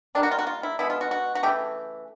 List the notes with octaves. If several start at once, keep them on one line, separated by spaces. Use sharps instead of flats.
D#3 G3 A#3 D4
F#4
F4
F#4
F4
E4
B2 G#3 B3 E4
F4
F#4
F#4
F#4
C#3 E3 A3 G4